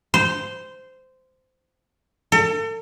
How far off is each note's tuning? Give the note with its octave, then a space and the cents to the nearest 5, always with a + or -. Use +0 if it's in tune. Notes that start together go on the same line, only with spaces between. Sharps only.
C5 -15
A4 +40